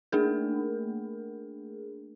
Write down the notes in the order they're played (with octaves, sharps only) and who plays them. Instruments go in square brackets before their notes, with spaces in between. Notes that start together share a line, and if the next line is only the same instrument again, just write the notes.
[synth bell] A3 A#3 D4 G#4 A#4